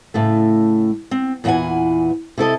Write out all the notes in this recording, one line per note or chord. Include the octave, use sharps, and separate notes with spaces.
A2 C#3 A3
C4
E2 A#2 E3 D#5 F#5 G#5
C3 E4 A4 D#5